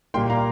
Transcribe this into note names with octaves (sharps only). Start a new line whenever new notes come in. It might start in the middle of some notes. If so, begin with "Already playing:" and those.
A#2 G3 A#3 G5 C6
F5 A#5